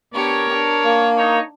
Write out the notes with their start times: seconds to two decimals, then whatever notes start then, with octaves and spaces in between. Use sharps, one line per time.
0.14 B3 D4 G4 A#4 C#5
0.54 D4
0.84 A#3
1.17 D#4 C#5